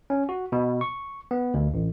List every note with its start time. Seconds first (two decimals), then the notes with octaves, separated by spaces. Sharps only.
0.10 C#4
0.29 F#4
0.52 B2
0.81 C#6
1.31 B3
1.54 D2
1.74 A1